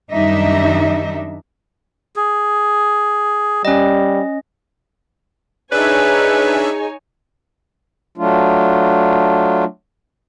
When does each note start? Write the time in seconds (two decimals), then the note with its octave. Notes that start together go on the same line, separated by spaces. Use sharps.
0.12 F#2 D#3 G3 D4 D#4 E5
2.16 G#4
3.65 G3 C#4 D#5
5.72 D4 D#4 G#4 B4 C#5 E5 G#5
8.18 F#3 A3 D4 F4